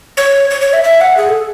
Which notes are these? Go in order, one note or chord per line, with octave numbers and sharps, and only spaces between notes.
C#5
C#5
C#5
E5
E5
F#5
G#4
A4